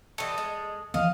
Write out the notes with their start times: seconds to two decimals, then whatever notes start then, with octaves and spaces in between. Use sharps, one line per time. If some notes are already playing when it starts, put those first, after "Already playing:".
0.18 E3 G3 A3 A4 D#5
0.38 G#3
0.94 E3 F3 B3 D#5 F5